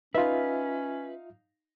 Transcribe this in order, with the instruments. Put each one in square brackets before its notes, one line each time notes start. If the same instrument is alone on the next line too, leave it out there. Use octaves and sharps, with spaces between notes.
[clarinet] C#4 [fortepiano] D#4 F5 [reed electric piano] F4 E5 [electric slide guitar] B4